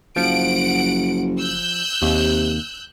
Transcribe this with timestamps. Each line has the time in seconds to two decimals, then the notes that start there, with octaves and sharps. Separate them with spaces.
0.16 F#1 F3 F#5 D7
1.39 E6 F#6 G6
2.02 D#2 C3